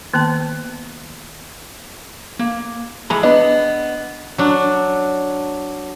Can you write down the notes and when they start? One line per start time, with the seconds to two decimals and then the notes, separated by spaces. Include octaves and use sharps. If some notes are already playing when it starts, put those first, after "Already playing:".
0.14 D#3 A#3 B3 A5
2.39 A#3
3.10 E3 G#3 A#5 B5
3.23 B3 D4 D#5
4.38 F#3 D4